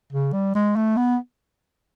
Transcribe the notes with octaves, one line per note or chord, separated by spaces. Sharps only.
C#3
G3
G#3
A3
B3